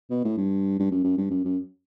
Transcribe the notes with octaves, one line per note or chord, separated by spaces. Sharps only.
B2
A2
G2
G2
F#2
F#2
G2
F#2
F#2